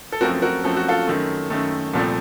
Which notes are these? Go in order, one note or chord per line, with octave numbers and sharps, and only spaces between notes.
A4
F#2 F3 A3 C4 F#4 A#4
F#4 A#4
F#2 F3 A3 C4 A4
F#4
F4 A4
F#2 D#3 A3
F#2 D#3 A3
C2 A#2 F3 A3 C4